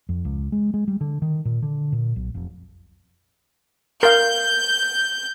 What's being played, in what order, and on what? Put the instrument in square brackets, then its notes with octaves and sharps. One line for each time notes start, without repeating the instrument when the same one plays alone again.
[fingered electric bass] F2
C#2
G#3
G#3
G3
D3
D#3
A#2
D3
A#2
B1
F1
[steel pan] A#4 F5 [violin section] G6